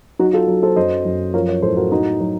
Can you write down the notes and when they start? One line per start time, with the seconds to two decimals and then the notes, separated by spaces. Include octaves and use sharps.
0.19 F#3 D#4 F#4
0.33 F4 A4
0.48 F#3
0.63 A4 C5
0.76 F#2 C5 D#5
1.05 F#2
1.34 F3 A#4 C#5
1.48 A#4 C#5
1.62 A2 A4 C5
1.76 F#4 A#4
1.91 F#3 D#4 F#4
2.20 F#3